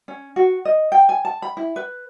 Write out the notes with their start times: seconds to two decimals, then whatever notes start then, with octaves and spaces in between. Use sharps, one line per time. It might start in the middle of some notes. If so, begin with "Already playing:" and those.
0.08 C#4
0.36 F#4
0.65 D#5
0.92 G5
1.09 G#5
1.25 A5
1.42 B5
1.57 E4
1.76 B4